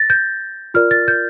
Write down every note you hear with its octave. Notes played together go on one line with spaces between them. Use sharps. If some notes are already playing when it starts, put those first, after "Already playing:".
Already playing: A6 A#6
G6
F4 A#4 D5 F6
A6
G6